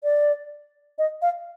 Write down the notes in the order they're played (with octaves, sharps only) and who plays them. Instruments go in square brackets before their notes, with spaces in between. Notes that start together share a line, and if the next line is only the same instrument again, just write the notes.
[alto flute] D5
D#5
F5